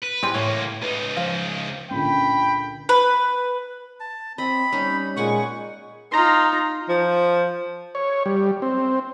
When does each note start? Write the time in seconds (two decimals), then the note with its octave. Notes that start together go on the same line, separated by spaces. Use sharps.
0.03 B4
0.23 G3 G#3 C4 E4 G5
0.34 C#2 A2 A#3 C#5
0.82 C#2 D#4 B4
1.17 F3 F5
1.91 C#2 A#2 D3 G5 B5
2.89 B4
4.00 A5
4.38 C4 D#5 B5
4.72 G3 C#4 D#4
5.17 A#2 G#3 B4 F#5 G#5 C#6
6.12 D#4 F4 A#5 C6
6.89 F3
7.95 C#5
8.26 G3
8.62 C4